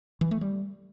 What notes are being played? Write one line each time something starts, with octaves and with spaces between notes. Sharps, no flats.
E3
A3
G3